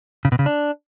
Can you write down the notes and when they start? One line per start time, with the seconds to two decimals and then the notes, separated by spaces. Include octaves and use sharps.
0.25 C#3
0.32 B2
0.39 C#3
0.46 D4